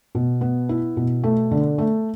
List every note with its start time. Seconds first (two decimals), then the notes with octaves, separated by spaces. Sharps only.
0.15 B2
0.41 B3
0.69 E4
0.97 B2
1.24 A3
1.51 D3
1.78 A3